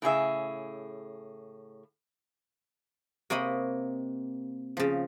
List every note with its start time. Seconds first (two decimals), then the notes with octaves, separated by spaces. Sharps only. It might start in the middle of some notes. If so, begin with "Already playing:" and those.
0.02 A2 C#3 G#4 E5
3.30 C3 A#3 C#5 D#5 B5
4.77 C#3 F3